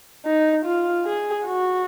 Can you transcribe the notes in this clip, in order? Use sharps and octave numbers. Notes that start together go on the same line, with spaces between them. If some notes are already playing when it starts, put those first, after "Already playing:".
D#4
F4
G#4
F#4